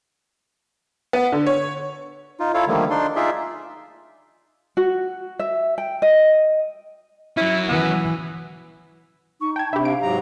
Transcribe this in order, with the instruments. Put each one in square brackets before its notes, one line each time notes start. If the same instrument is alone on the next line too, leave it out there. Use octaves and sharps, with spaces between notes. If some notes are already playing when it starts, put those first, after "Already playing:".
[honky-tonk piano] B3
D3
C#5
[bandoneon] D#4 F4
E4 F4 A4 C#5 F5
D3 D#3 F3 G3 A3 A#3
D4 D#4 D5 C6
D#4 F4 G#4 D5 E5
[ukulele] F#4
E5
G5
D#5
[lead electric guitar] F#3 C#4 [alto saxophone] E4
[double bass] E3 [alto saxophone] B3
[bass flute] D#4 [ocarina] C#6
[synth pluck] G5 G#6 [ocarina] A5
[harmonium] C3 [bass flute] D4 [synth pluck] G4 E5 [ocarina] B5
[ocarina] F5 [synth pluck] D7
[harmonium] G#2 F#3 A#5 [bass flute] G4